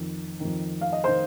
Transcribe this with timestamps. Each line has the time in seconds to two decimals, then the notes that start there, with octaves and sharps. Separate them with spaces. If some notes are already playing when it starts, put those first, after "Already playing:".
Already playing: F2 D#3
0.40 F2 D#3
0.81 F5
0.93 D#5
1.04 D#3 C5